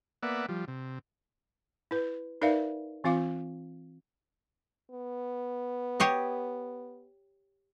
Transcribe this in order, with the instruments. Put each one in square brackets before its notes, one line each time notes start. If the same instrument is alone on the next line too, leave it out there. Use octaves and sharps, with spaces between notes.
[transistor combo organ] A#3 B3 D5 E5 F#5
F3 G3
C3
[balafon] E4 B4
D#4 A#4 B4 D5 E5 F5
E3 C4 F4 F5 D6
[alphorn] B3
[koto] G4 C#5 D#5